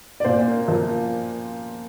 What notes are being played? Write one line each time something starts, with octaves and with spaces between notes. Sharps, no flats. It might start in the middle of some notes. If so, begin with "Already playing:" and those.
D5
A#2 C5
A#3
F3